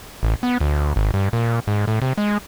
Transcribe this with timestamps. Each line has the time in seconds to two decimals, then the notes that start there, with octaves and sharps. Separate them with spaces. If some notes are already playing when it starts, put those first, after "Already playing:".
0.23 A1
0.43 B3
0.61 D2
0.96 G#1
1.14 G2
1.33 A#2
1.67 G#2
1.88 A2
2.02 C3
2.18 G#3